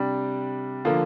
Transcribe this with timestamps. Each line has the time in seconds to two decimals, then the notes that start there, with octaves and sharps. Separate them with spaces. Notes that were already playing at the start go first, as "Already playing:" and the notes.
Already playing: C3 G3 D4
0.85 D3 F3 A#3